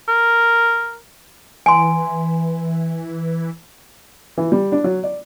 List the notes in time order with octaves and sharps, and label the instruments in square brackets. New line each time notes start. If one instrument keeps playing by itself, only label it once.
[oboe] A#4
[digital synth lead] E3 [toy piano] G#5 C6
[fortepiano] E3
G3
D4
F#3
D5